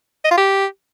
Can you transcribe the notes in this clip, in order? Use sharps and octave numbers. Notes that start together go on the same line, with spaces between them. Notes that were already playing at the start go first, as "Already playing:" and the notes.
D#5
F4
G4